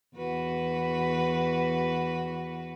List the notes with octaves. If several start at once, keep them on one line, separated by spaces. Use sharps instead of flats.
E2 F#4 B4